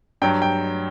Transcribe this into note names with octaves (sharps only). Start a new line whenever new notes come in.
G2 F#3 G5
G5